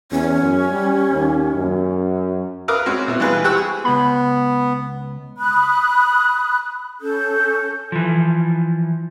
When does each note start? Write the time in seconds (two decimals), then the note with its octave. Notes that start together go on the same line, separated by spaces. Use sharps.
0.11 E2 C#4
0.42 F#2
0.71 G3
1.12 D#2
1.55 F#2
2.68 A#4 B4 E5 F5 D6 D#6
2.86 G#3 C4 C#4 F#4
3.08 B2 B3 E4
3.20 E3 G3 G#3 F4 G#4 B4
3.44 G4 C5 F#5 C#6 E6
3.57 G#4
3.84 C#2 B3 B5
5.38 B5 D#6 F#6
7.00 C#4 A4 G6
7.92 E3 F3